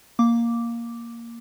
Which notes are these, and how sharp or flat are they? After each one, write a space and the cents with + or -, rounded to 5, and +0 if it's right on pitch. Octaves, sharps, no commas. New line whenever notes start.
A#3 +0 D6 -5